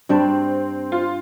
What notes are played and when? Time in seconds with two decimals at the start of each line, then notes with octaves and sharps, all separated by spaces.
0.09 G2 G3 C4 D4
0.92 F4